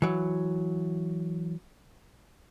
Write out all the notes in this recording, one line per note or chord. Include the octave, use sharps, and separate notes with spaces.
E3 F#3